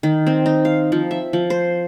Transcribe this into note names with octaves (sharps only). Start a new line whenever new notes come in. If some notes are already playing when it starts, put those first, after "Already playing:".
D#3
C4
D#4
F5
F3
E5
F3
C5